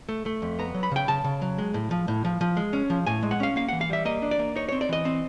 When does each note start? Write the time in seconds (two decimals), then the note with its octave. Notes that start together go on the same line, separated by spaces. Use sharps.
0.09 A3
0.26 A3
0.42 F2
0.59 B3 A#5
0.74 F#3
0.83 B5
0.91 C#3 G5
1.08 C#3 A5
1.24 C#3
1.42 F#3
1.58 G#3
1.74 A2
1.91 F3
2.08 A2
2.25 F3
2.41 F3
2.57 G#3
2.73 C#4
2.90 F3
3.07 A2 G#5
3.23 G#3
3.31 F#5
3.40 C#4 F5
3.56 A#3 F5
3.69 E3 F#5
3.81 F5
3.90 G3 E5
4.05 A#3 D#5
4.22 D4
4.31 D5
4.39 A#3
4.55 D#4 C#5
4.69 C4 C#5
4.81 D5
4.89 E3 D#5
5.05 C4